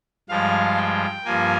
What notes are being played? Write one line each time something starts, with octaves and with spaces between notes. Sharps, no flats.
G2 F3 G#3 F5
G5
G2 F3 A#3 G#5